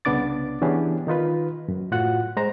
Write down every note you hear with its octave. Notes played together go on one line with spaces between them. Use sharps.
C2 C#3 B3 D4 D6 A6
E3 B3 C#4 D4 G4 G#4
D#3 D#4 F4 B4
F#2
A2 F4 F#4 F#5 F#6
G#3 C5 A#5